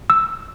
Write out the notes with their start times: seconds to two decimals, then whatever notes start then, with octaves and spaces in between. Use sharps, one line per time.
0.10 E6